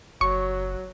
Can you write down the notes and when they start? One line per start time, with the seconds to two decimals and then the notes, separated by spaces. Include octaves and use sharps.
0.21 F#1 F#3 C#6